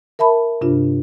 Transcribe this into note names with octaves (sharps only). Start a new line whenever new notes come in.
A#4 E5 A5 B5
G2 C3 D4 F4